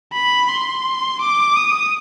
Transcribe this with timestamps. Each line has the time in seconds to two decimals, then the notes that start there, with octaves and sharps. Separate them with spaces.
0.13 B5
0.49 C6
1.21 D6
1.56 D#6